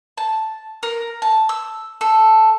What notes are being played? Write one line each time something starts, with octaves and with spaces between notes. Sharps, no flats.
A5
A#4
A5
E6
A4